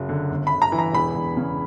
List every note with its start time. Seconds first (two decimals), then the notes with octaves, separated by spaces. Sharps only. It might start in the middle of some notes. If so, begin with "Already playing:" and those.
Already playing: F#1 F#3
0.09 D3
0.30 G1
0.47 G1 B5
0.62 A#5
0.72 E3
0.79 A#5
0.93 E1 B5
1.16 E1
1.37 C#3